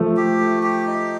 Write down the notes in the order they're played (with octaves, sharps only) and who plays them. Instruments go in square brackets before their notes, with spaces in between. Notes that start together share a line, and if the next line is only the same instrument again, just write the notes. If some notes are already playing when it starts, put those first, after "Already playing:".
Already playing: [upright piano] F3 A3
[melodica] G4
A3
G4
D#4